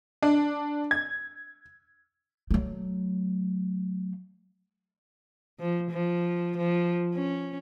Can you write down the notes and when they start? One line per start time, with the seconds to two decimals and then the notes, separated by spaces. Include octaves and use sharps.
0.23 D4
0.91 G#6
2.51 F#3 A3
5.59 F3
5.91 F3
6.57 F3
7.15 C#4